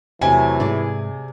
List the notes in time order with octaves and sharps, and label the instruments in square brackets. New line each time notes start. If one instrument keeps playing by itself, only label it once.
[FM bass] E2 [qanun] C3 F#3 A3 [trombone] E3 [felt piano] G#5
[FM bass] G#2 [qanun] G#4 D5